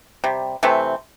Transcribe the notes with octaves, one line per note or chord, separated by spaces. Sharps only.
C3 G3
C3 E3 A3 C4